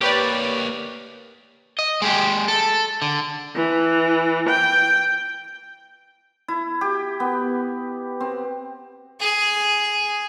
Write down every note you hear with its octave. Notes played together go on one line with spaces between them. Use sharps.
A#3 G4 B4 C#5 D5
D#5
G#3 G4
A4
D3
E3
G5
E4
G4
B3
C4
G#4